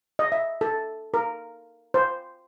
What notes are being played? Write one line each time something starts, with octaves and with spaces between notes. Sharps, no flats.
D#5
E5
A4
A#4
C5